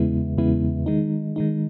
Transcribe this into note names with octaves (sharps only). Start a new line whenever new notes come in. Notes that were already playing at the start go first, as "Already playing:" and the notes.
Already playing: E2 C#3 G#3 B3 E4
E2 C#3 G#3 B3 E4
D#3 G#3 D#4
D#3 G#3 D#4